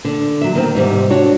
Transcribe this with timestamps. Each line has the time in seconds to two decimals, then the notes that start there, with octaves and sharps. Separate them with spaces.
0.05 D3
0.41 F#3 E5
0.55 D#3 B3 C4
0.75 G#2 C3 G3 C4
1.11 D4 F#4 C#5